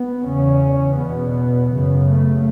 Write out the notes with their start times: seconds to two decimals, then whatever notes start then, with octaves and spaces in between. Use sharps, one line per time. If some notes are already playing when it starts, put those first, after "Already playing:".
Already playing: B3
0.24 E2 C#3 C#4
0.97 E2 B2 B3
1.69 F#2 C#3
2.06 A3